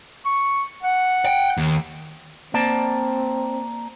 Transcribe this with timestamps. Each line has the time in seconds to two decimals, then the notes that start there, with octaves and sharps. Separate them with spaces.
0.25 C#6
0.83 F#5
1.26 G5
1.57 D#2
2.54 A#3 C4 D5 A5